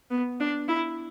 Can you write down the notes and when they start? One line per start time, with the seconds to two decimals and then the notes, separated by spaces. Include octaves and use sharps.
0.10 B3
0.40 D4
0.69 E4